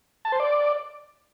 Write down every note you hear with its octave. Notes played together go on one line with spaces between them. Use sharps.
A5
C5
D5